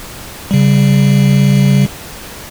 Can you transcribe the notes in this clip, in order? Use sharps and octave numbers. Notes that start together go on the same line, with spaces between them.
C#3 G3